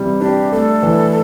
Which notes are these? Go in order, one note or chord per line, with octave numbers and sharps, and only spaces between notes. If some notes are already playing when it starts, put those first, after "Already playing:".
Already playing: C3 E3 G3
D4 G4
A3 A4
E3